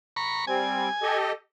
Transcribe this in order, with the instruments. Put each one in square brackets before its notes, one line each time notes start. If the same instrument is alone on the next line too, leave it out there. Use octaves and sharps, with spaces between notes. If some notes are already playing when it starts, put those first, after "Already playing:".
[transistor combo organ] A#5 B5 C#6
[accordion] G3 C4 [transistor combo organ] G#5
[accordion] G4 A4 D#5